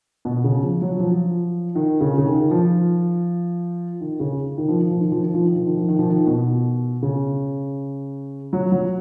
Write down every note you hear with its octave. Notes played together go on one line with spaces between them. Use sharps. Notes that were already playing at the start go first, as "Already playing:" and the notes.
B2
C#3
F3
F#3
F3
D#3
C#3
C#3
D#3
F3
D#3
C#3
D#3
F3
D#3
F3
D#3
F3
D#3
F3
D#3
F3
D#3
F3
D#3
F3
D#3
B2
C#3
F#3
F#3